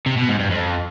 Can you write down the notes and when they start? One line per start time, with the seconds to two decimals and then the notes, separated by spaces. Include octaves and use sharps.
0.06 C3
0.17 B2
0.29 G#2
0.39 G2
0.51 F2